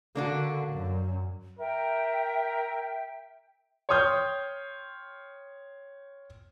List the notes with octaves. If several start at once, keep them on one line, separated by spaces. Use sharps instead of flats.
D3 A#3 D4 F#4
F#2
A#4 E5 G5
C#5 G5 C6 D#6 F6 G6